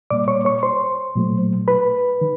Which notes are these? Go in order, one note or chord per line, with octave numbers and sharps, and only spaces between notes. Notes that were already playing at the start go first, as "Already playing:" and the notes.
A#2 G3 A#3 D5 D6
C#5 C#6
C#5 C#6
C5 C6
A#2 F#3 A3
B4 B5
D#3